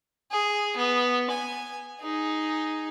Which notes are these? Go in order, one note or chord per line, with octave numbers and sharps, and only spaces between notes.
G#4
B3
G#5
D#4 G#4